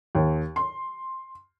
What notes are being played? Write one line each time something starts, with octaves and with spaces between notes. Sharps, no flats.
D#2
C6